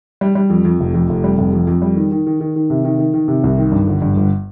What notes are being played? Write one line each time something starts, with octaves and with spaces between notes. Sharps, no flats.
G3
G3
F2
F2
F1
F2
F1
G3
F1
F2
F2
G3
D#3
D#3
D#3
D#3
D#3
C3
D#3
D#3
D#3
C3
C2
D#3
G2
G1
G2
G1